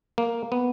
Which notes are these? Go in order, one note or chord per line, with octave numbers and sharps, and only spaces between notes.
A#3
B3